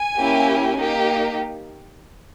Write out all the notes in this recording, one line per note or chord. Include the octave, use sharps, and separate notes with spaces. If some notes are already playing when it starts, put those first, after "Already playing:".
Already playing: G#5
A#3 C#4 E4 G4
A#3 D#4 G4